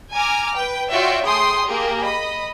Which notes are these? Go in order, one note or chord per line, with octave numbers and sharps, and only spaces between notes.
G#5 A#5 D6 F6
B4 G5
F4 F#4 C#5 D5 E5 G5
A3 G#4 G5 C6 D#6
A#3 G4 G#4 A#4
D#5 B5